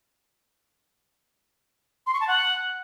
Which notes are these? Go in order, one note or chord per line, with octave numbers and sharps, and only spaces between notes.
C6
C#6
A5
F#5